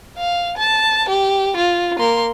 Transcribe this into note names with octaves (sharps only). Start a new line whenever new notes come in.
F5
A5
G4
F4
A#3 C6